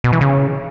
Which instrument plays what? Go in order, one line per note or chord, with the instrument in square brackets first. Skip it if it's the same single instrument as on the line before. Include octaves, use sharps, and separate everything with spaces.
[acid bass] B2
E3
C#3